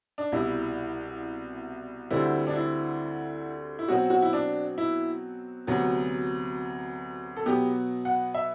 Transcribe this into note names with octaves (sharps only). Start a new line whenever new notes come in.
D4
C2 B2 G3 E4
D2 D3 G3 C4 E4
D4
E4
E4
B2 F#3 C4 F#4
F#4
E4
D4
E4
D2 C3 F#3 B3
A4
B2 F#3 B3 G4
F#5
E5